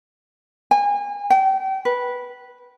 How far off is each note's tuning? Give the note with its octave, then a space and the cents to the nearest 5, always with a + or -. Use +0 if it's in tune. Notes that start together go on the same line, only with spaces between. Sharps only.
G#5 -35
G5 -35
B4 -10